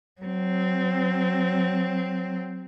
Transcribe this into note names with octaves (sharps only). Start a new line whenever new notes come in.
F#3 C4